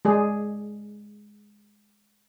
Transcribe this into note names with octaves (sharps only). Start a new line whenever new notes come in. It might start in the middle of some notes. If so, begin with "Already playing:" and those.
G#3 G#4 D5